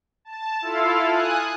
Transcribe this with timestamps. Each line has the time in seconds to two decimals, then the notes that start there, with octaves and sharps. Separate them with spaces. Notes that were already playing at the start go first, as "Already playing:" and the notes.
0.25 A5
0.62 E4 F4 A4 F5
1.09 G#5 D#6 F#6